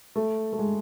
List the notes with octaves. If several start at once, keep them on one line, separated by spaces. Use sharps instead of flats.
A3
A3
G#3